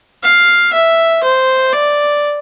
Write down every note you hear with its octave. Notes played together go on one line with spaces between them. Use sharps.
F5
E5
C5
D5